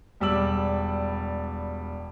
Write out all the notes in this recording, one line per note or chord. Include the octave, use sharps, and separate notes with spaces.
E1 G3 D5 E6 F#7